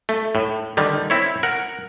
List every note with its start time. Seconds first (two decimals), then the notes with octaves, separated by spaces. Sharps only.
0.09 A3
0.35 A2
0.77 D3 D#3 G3
1.10 C4 E4 C#5
1.43 A#4 F#5